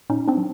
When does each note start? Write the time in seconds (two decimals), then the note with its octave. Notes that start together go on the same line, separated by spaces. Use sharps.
0.10 A#2 C#4 D#4
0.28 C4 D4
0.37 F#3